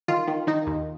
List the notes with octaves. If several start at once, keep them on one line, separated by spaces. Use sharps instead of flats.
D#3 F4
D#3
D#3 D#4
D#2